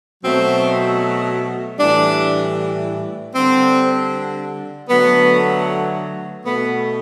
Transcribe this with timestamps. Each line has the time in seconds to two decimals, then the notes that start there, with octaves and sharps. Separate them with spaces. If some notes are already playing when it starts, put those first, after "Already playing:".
0.23 B2 F#3 A3 C4
1.78 A2 E3 G3 D4
3.34 D3 G3 C4
4.89 D3 F#3 A3 B3
6.45 B2 A3 B3